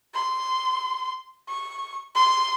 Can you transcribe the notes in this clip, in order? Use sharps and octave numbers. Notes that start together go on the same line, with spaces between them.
C6
C#6
C6